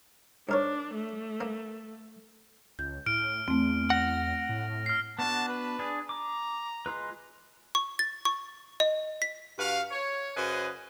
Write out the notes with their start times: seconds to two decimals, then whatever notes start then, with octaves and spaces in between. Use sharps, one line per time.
0.49 G#2 D4 A#4 C#5
0.94 A3
1.41 A#3
2.79 C#2 G6
3.06 A2 F6 D7
3.48 E2 A3 C4
3.90 F#5 A#6 F7
4.49 A2
4.86 F6 C7
5.19 B3 D4 F#4 A5
5.49 B4
5.79 D4 G#4
6.09 A#5 D6
6.86 G#3 F4 B4
7.75 C#6
7.99 A6
8.25 C#6
8.80 D#5
9.22 B6
9.58 G2 F#4 B4 F5
9.91 C#5
10.36 F#2 C#3 B4 C5 D#5 G#5